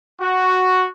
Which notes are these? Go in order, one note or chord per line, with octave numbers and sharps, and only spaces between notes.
F#4